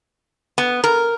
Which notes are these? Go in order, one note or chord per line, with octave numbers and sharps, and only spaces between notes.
B3
A#4